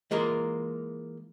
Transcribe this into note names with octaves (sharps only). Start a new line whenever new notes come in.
E3 G#3 A#3 F4 A#4